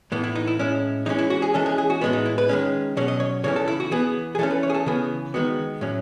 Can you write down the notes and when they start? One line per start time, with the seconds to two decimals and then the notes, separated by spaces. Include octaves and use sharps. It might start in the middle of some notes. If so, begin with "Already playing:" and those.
0.12 A2 E3 B3
0.24 E4
0.35 D#4
0.47 E4
0.59 A2 G#3 C#4 E4
1.06 E3 G#3 C#4 D#4
1.18 E4
1.30 F#4
1.42 G#4
1.54 E3 G#3 C#4 A4
1.66 G#4
1.78 G#4
1.90 F#4
2.01 A2 G#3 B3 F#4
2.13 D#4
2.26 E4
2.38 B4
2.49 D#3 G#3 C#4
2.97 B2 F#3 C#4 C#5
3.08 D#5
3.20 C#5
3.44 C#3 E3 A3 C#4 C#5
3.56 A4
3.68 E4
3.80 F#4
3.91 E3 B3 G#4
4.35 G#4
4.39 E3 A3 C#4 A4
4.51 B4
4.63 C#5
4.70 G#4
4.74 A4
4.86 C#3 E3 B3 G#4
5.34 D#3 G#3 B3 F#4
5.81 A2 F#3 C#4